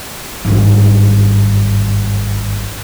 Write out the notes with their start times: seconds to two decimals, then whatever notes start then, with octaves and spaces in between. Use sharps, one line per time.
0.45 G#1 G2